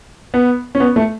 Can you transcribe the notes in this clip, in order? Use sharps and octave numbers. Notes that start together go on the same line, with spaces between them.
B3
C#4
B3
A3